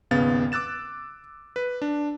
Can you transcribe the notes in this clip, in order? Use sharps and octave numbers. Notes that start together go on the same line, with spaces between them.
G#1 D#2 C#3 B3 F5 A6
D6 E6 F#6 A6 E7
B4
D4